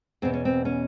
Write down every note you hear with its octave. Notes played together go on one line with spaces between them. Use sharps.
E2 B2 C4
C#4
C4
C#4